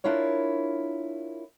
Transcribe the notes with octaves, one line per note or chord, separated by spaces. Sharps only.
D4 E4 F4 A#4 C#5